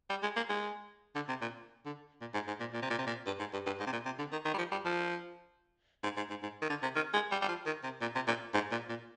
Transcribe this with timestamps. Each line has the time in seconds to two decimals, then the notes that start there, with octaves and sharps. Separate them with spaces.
0.10 G3
0.23 G#3
0.36 A#3
0.49 G#3
1.15 D3
1.29 C3
1.42 A#2
1.86 D3
2.21 A#2
2.34 G#2
2.48 G#2
2.60 A#2
2.73 A#2
2.82 C3
2.90 A#2
2.98 C3
3.07 A#2
3.26 G2
3.40 G#2
3.53 G2
3.66 G2
3.80 G#2
3.86 C3
3.92 A#2
4.05 C3
4.19 D3
4.32 D#3
4.45 D#3
4.54 G3
4.58 F3
4.71 G3
4.85 F3
6.03 G#2
6.17 G#2
6.30 G#2
6.43 G#2
6.62 D#3
6.70 D3
6.83 C3
6.96 D#3
7.14 G#3
7.31 G3
7.42 G3
7.48 F3
7.66 D#3
7.84 C3
8.01 A#2
8.15 C3
8.28 A#2
8.54 G#2
8.72 A#2
8.89 A#2